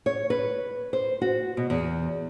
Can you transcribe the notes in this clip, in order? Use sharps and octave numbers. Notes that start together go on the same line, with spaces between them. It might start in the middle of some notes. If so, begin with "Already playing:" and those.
C#5
B4
C5
F#4
B2
E2